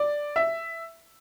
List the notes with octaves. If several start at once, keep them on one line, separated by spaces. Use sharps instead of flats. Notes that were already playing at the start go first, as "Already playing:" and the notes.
Already playing: D5
E5